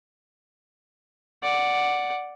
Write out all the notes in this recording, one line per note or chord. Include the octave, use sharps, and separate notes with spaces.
D5 F#5